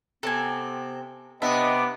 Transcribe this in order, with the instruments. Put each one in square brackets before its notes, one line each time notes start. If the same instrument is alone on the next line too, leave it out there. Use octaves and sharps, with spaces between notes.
[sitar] C3 C4 [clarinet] B3 [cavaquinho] A4 G#5
[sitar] C3 D4 [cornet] B3 [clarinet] D#5 [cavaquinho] E5